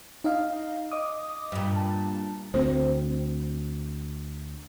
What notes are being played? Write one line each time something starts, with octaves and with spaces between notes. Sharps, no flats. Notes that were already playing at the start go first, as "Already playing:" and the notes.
D#4 D#5 F5
D#5 D6 D#6
G2 A#2
A5
D2 C4 C5